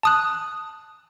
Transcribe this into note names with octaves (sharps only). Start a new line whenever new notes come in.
A5 D#6 F#6